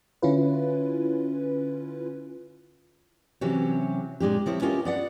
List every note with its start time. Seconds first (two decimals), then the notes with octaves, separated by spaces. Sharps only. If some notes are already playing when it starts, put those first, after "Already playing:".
0.22 D3 C#4 E4 F4 B4
3.41 C3 E3 F#3 C#4 F#4 G4
4.20 A#2 G#3 D4 G4
4.46 F3 C4 E4 C#5
4.62 C#4 E4 F4 G4 A#4 D#5
4.85 B3 D5 F#5